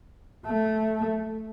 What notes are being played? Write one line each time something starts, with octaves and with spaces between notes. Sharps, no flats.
A3